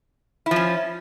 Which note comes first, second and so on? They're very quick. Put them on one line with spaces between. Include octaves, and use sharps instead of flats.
E4 F3 C#4